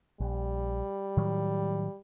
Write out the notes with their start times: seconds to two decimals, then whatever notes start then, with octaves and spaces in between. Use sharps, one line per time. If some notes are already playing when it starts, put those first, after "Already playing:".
0.20 A#1 G3
1.17 A2 D#3 F#3